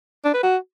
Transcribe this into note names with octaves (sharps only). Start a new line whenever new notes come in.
D4
B4
F#4